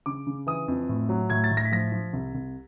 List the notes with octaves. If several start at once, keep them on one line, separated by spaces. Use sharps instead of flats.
C#3 D6
C#3
E3 D#6
F2
A2
F#3
A2 G#6
A6
A2
A#6
B6
F3 A#6
F3
C2
C2